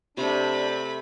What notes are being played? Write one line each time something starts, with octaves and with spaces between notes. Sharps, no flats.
C3 A3 D4 B5